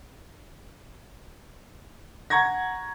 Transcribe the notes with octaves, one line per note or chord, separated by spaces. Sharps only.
F#5 A#5 C#6 G#6 A#6